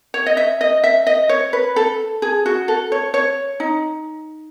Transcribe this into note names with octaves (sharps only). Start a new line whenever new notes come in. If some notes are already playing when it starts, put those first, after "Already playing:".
C#5
D#5
E5
D#5
E5
D#5
C#5
B4
A4
G#4
F#4
A4
C#5
C#5
D#4